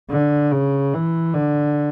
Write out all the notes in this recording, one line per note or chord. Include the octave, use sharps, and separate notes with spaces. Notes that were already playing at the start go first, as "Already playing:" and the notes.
D3
C#3
E3
D3